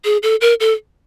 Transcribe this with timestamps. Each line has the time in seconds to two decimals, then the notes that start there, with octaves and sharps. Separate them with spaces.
0.04 G#4
0.23 A4
0.41 A#4
0.60 A4